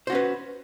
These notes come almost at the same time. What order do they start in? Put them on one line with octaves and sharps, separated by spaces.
C5 F#4 C#4 B4